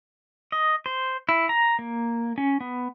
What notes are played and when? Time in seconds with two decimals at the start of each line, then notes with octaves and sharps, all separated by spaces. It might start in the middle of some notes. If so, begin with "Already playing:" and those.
0.52 D#5
0.86 C5
1.29 E4
1.49 A#5
1.79 A#3
2.38 C#4
2.60 B3